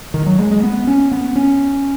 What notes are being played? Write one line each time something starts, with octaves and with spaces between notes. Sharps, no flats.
D#3
F#3
G#3
G#3
B3
C#4
B3
C#4